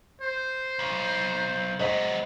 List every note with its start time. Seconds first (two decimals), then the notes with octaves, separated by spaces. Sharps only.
0.22 C5
0.79 B1
1.79 F#3 G#3 C5 D#5 B6